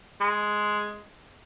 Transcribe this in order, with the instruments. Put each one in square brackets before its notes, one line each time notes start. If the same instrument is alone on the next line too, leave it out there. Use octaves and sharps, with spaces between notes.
[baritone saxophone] G#3